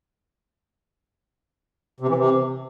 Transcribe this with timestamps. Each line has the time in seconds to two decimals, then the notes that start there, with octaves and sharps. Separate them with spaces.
2.00 C3
2.09 E3
2.17 C3